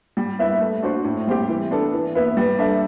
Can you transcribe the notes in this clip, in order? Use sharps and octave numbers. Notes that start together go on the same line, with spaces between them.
G3
B3 E4 B4 E5
A3
D4 F#4 C5
A2
G3 C4 G4
E3
B3 D4 A4
E3
B3 E4 B4 E5
G3
D4 A4 E5